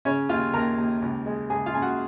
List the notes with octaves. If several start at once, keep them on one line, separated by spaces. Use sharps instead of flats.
C#3 C#4 C#5
D#2 F4 F5
D#2 A#4 A#5
D#2
C#2
G#3
C#2 G#4 G#5
F4 F5
C#3 G#5
F#4 F#5